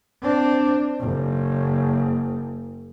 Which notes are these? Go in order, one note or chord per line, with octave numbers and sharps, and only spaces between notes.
C4 D4
F#1